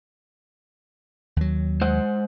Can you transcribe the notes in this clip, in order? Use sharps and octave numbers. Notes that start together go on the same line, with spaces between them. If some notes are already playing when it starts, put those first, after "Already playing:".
D#2 F#3
G#3 C5 F#5